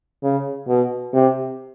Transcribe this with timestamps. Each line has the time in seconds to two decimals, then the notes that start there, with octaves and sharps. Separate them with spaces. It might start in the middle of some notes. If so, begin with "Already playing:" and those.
0.24 C#3
0.68 B2
1.14 C3